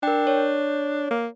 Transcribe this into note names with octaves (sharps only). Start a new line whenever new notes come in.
D4 A#4 G5
C#5
A#3